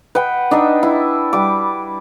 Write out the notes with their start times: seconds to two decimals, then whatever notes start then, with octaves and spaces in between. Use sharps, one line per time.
0.15 B4 F#5 G5
0.51 D4 D#4 D#5 E5
0.83 E4
1.33 G3 D6